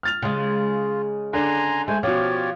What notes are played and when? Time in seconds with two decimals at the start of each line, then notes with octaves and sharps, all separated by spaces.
0.03 F6 A6 F7
0.22 C#3 G#3 F4
1.33 D3 D4 G#5 A#5 C6
1.88 G#3 A3 C5 G#5
2.03 B2 F3 C#4 G4 C#5 D5